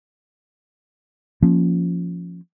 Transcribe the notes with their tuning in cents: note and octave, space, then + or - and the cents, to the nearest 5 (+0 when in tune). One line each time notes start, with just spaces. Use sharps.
F3 +0 A#3 +0 C#4 +0